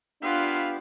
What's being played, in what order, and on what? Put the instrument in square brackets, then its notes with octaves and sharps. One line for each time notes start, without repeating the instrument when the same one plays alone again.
[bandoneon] B3 G4 [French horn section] D4 [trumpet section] E4 B4 F5 [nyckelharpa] F4 F#5